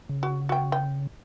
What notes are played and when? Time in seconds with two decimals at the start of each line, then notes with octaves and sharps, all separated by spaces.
0.09 C#3
0.23 F#4
0.49 F#4 G5
0.72 G5